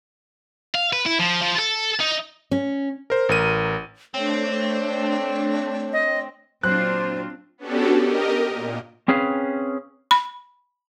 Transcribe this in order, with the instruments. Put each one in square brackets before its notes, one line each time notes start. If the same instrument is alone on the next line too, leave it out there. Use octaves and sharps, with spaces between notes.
[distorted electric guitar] F5
B4
E4
F3
F3
A4
D#4
[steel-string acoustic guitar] C#4
[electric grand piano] A#4 C5
A1 A#4 D#7
[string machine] A3 D4 [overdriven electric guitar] C4 [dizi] C#5
[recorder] D#5
[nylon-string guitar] A#2 F#3 [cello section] C4 D4 F4 [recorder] C5 [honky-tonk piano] F#6
[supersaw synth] B3 C#4 D4 F#4 G4 A4
G4 A#4 D#5
A#2
[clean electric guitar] C4 C#4 G#4 B4 F5
[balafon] B5